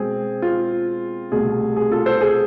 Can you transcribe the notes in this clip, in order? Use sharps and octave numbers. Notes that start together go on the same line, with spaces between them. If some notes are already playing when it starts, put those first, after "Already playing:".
Already playing: B2 G#3 C4 G#4
F4
C2 B2 A3 G#4
G#4
F4 A4
A4 C5
G#4